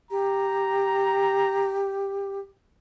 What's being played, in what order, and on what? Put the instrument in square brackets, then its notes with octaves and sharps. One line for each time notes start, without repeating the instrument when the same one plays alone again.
[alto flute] G4 [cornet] A#5